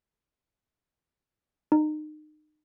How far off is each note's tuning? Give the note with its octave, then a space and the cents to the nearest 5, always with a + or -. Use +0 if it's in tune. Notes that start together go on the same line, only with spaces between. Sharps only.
D#4 -30